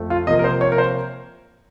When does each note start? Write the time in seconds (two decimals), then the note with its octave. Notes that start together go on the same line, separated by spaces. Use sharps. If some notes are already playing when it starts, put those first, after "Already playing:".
Already playing: F2 A3
0.10 F4
0.27 C3 F3 A#3 D#5
0.39 A#4
0.44 C5
0.61 C#5
0.72 A#4
0.78 C5